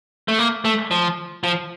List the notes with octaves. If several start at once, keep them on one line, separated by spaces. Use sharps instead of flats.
A3
A#3
A3
F3
F3